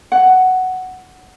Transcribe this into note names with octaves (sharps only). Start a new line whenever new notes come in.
F#5